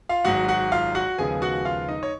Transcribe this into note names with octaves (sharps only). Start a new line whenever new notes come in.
F4 F5
G#1 G#2 F#3 F#4 F#5
F#4 F#5
F4 F5
F#4 F#5
D#2 C#3 F3 G#3 B3 G#4 G#5
F#4 F#5
F4 F5
D#4 D#5
C#5